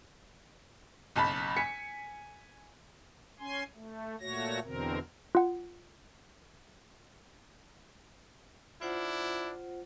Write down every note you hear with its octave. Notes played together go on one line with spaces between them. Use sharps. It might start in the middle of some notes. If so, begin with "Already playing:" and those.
F#1 B1 A5 B5
G#5 B6 C#7
C#4 G#5 C6
A3
A#2 A3 F#4 C#5 A#6
E2 B2 D3 C4 A#4
F4 F#5
D4 E4 F4 C5 F#5